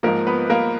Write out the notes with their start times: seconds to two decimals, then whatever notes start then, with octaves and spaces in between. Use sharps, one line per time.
0.03 G#2 F3 A#3 A#4
0.27 B3 B4
0.50 A#3 A#4